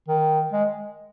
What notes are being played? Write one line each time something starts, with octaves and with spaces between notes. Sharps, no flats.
D#3
G#3